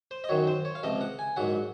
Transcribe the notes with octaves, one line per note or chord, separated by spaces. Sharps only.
C5
D#5
F#2 D#3 F#3 C#5
C5
C#5
F5
C#2 C3 F3 D#5
F#5
G#5
A#1 G#2 F#3 F#5